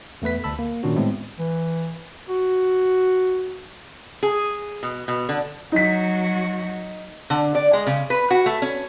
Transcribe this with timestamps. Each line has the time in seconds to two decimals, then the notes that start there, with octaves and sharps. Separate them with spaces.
0.22 E2 A3 B3 B4 B6
0.44 D2 A5 B5 E6
0.59 A#3
0.83 A#2 D#3 C#4 D4 F#4
0.96 A2 G3 G#3 B3 C4
1.39 E3
2.29 F#4
4.23 G#4
4.83 B2
5.08 B2
5.29 D3
5.72 F#3 D#4 F#4 B6
7.30 D3
7.55 D5
7.73 G#3
7.86 C#3
8.10 B4
8.31 F#4
8.46 A3
8.62 C#4